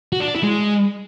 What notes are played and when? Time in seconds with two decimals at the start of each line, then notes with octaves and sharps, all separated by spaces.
0.12 F#4
0.20 D4
0.28 D5
0.35 E4
0.43 G#3